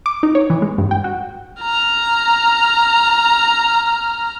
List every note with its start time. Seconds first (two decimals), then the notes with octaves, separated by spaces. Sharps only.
0.06 D6
0.23 D#4
0.35 C#5
0.50 E3
0.62 G#3
0.78 G2
0.91 G5
1.04 F#4
1.62 A#5 F6